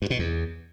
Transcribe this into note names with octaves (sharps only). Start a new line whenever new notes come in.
G2
B2
E2